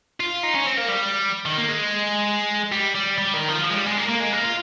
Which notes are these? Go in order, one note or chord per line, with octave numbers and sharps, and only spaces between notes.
F4
D#4
C#4
C4
A#3
G3
D#3
A#3
G#3
G3
G3
G3
D#3
F3
F3
G#3
G3
G#3
A#3
A#3
G#3
A#3
F4